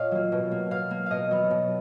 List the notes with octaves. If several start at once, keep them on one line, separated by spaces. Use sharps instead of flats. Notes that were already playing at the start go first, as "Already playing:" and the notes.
Already playing: A#2 C#5 D#5 F5
F#3 A#3
B2
A#3
B2 F5
A#3
B2 D#5 F5
F#3 B3
B2